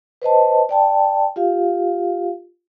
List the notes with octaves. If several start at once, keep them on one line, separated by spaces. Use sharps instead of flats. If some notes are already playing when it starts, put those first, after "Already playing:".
B4 C5 D#5 A5
D5 G5 A5
F4 G4 F5